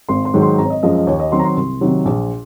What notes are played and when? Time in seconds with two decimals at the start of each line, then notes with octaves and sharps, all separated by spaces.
0.09 G#1 C6
0.25 C6
0.34 G#2 D#3 F#3
0.42 C6
0.58 G#1 A#5
0.66 C#5
0.70 D#5
0.83 F#2 F3 G#3 D#5
0.95 D#5
1.07 D#2 C#5
1.20 D#5
1.32 D#3 F#3 C4 C6
1.39 A#5
1.44 C6
1.57 C2 C6
1.81 C3 D#3 F#3
2.05 A#1